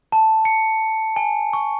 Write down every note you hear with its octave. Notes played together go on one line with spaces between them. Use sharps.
A5
C#7
G#5
C#6